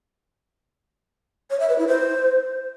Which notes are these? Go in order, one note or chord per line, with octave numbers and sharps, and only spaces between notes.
C#5
E5
B4
E4
C5